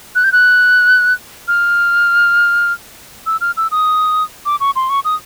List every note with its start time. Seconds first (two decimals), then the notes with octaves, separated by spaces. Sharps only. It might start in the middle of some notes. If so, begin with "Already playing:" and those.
0.15 F#6
0.24 G6
0.32 F#6
1.48 F6
3.26 E6
3.41 F6
3.57 E6
3.71 D#6
4.46 D6
4.60 C#6
4.76 C6
4.90 C#6
5.05 D#6